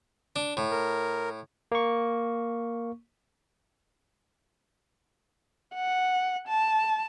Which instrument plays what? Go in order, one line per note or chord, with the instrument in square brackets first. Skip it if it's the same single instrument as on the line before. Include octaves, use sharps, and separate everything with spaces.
[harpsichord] D4
A2
[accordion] A#4
[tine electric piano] A#3 C#6
[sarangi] F#5
A5